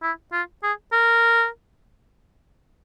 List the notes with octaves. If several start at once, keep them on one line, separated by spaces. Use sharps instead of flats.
E4
F4
G#4
A#4